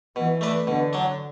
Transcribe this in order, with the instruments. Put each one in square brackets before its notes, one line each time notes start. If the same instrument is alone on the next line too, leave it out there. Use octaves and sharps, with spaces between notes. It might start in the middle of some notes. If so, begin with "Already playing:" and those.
[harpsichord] B2 [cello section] E3
[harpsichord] A3 D4 B4 D5
[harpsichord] B2 [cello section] D3
[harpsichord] F#3 D4